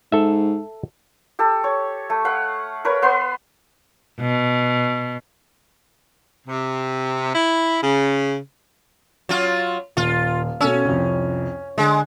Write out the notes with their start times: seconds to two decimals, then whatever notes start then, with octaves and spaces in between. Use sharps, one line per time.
0.12 G#2 A4 E5
1.39 G4 A4
1.64 C#5
2.10 A3
2.25 F5 F#5 B5
2.85 A#4 B4 C#5
3.02 B3 B4 C6
4.20 B2
6.47 C3
7.35 E4
7.83 C#3
9.29 F#3 F4
9.97 D#1 F4
10.61 B2 C#4 A4 E6
10.85 C2 F2
11.78 D3 G#3